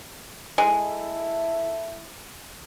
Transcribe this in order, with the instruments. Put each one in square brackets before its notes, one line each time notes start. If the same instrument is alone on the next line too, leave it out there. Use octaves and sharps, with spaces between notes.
[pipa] G#3 [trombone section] E4 A4